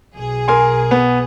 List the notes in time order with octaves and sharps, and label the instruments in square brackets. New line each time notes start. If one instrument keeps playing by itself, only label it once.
[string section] B1 G#4
[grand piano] A#4 G#5 C6
B3